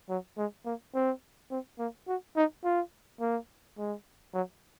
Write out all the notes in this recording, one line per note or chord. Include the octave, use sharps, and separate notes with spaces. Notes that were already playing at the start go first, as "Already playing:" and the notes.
F#3
G#3
A#3
C4
C4
A#3
F#4
D#4
F4
A#3
G#3
F#3